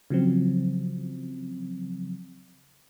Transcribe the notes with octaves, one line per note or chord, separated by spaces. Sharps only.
C#3 F3 F#3 C4